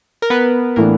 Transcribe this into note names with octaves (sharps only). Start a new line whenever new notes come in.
A#4
B3 B4
A2 E3 A3 A#3 D4 A#4